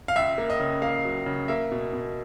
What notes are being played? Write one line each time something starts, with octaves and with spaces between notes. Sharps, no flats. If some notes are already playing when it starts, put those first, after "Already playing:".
F5
C#2 E5
A#3
D#5
C#3
A#3 F5
F#3
C#3
A#3 E5
B2
B2